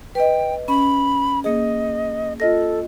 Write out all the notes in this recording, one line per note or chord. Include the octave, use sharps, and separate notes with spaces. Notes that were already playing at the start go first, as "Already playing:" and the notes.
B4 D#5 G5
C#4 B5
A#3 G#4 D#5
F4 A4 D#5 A#6